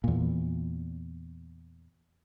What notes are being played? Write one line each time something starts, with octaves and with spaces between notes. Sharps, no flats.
E2 A#2